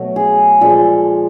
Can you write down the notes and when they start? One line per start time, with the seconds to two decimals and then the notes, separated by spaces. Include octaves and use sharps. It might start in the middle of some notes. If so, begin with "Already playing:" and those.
Already playing: B2 F#3 A3
0.16 G#4
0.61 A#2 F3 G#3 A4